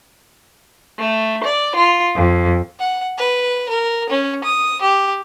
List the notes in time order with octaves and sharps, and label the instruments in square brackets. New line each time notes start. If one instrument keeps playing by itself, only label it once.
[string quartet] A3
D5
F4
F2
[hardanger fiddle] F#5
B4
A#4
C#4
D#6
G4